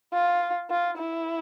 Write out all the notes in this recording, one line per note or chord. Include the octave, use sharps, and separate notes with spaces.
F4
F4
E4